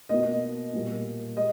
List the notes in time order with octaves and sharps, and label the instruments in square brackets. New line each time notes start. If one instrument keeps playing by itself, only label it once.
[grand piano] B2 A#3 D#5
A#2 G3 A#3
G#3 D#5